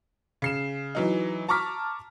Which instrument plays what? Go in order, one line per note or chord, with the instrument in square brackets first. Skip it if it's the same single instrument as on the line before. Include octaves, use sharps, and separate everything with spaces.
[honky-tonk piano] C#3 C7 E7
E3 F#3 D#4
A5 A#5 C#6 D6 F6 B6